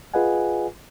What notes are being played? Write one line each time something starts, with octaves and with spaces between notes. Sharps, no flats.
F4 G#4 B4 D#5 F#5 G#5